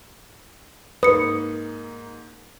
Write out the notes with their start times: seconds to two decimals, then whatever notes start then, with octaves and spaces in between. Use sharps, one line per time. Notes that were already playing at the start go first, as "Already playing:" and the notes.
1.03 G#2 A#3 B4 D#6 C#7